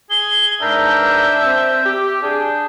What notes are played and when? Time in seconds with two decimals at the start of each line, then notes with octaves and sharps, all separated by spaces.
0.10 G#4 G7
0.61 G#2 D4 A#4 B4 E5 G6
1.44 C4
1.85 G4
2.23 D4 G#4 G6